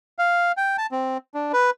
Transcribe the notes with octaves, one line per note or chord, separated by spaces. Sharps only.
F5
G5
A5
C4
D4
B4